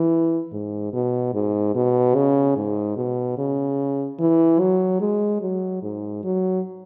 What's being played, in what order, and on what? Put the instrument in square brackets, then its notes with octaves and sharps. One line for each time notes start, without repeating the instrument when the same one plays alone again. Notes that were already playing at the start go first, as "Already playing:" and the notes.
Already playing: [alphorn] E3
G#2
B2
G#2
B2
C#3
G#2
B2
C#3
E3
F#3
G#3
F#3
G#2
F#3